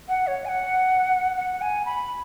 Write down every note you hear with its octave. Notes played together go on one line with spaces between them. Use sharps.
F#5
C#5
G#5
F#5
F#5
G#5
B5